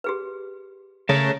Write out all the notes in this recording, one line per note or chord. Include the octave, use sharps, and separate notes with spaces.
G4 G#4 B4
C#3 A3 A#4 C#5 A5